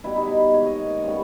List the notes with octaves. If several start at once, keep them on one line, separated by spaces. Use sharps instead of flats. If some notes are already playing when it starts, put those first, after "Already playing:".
B2 G3 B3 E4
D#4
E4
G#2 D#3 A#3 C#5
D#5
C#5
D#5
C#3 G3 B3 C#5